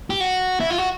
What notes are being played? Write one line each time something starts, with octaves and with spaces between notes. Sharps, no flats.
G4
F#4
E4
F4
F#4